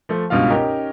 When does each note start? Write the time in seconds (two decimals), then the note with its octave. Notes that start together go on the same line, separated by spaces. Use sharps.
0.09 F3 A3
0.30 C#2 G2 B2 F4 F5
0.50 C#4 D#4 G4 A#4